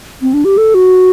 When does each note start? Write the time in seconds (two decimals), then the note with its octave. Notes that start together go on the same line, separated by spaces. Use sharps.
0.22 C4
0.34 D4
0.45 G4
0.58 A4
0.74 F#4